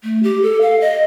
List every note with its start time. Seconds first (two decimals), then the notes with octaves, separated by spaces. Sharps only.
0.04 A3
0.23 G4
0.42 A4
0.61 F5
0.81 D#5